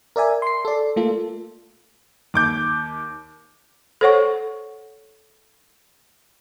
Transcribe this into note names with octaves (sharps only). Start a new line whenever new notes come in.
A#4 D5 E5 G#5
C6 C7
A4 D5
A3 A#3 F4 A4
D#2 D6 G6
A4 C5 C#5 F#5 C#6